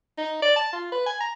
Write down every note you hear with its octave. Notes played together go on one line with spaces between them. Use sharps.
D#4
D5
A5
F4
B4
G#5
A#5